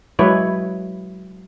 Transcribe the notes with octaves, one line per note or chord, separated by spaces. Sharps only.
F#3 G#3 E4 B4 C#5